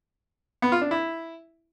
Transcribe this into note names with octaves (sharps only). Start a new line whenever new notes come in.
B3
F4
D4
E4